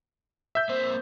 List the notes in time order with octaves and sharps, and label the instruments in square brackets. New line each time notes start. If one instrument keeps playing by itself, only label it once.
[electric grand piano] E5 G6
[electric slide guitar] A#3 C4 C5